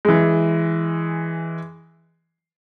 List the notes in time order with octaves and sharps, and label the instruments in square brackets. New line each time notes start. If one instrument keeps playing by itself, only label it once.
[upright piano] E3 G#3